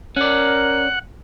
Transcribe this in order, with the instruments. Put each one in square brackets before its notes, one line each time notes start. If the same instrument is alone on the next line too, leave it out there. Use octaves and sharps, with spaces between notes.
[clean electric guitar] C#4 D5 [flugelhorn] A#4 [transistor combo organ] F#5